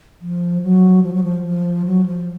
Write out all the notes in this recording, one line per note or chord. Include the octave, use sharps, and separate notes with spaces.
F3
F#3
F3
F#3
F3
F3
F#3
F3